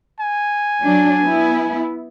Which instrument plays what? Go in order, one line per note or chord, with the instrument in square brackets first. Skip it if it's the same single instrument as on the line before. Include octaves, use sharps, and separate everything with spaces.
[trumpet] G#5
[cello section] F#3 D4
B3 E4